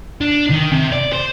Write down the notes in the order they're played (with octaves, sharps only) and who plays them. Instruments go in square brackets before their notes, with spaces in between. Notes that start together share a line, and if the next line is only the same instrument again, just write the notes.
[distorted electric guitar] D4
D#3
C3
D5
C5